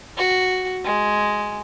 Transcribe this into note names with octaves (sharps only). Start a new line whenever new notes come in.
F#4
G#3